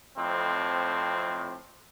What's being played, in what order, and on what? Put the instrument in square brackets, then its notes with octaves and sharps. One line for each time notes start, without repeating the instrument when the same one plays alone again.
[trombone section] F2 A2 C4